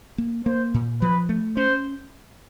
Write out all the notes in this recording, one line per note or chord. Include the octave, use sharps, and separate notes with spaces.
A#3
A#3 C5
A#2
F3 B4
A3
C#4 C5